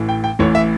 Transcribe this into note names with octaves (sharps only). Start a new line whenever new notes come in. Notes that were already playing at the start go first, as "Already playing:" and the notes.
Already playing: A1 A2 E3
G5
G5
A1 A2 E3 C#5
E5